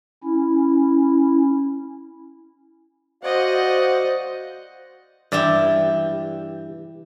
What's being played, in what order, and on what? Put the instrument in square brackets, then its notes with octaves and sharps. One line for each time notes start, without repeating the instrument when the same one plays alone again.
[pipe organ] C#4 E4
[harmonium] F#4 D5 F5 [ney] C5 [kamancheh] D#5 F#5
[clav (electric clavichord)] G2 D5 [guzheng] E3 E4 G4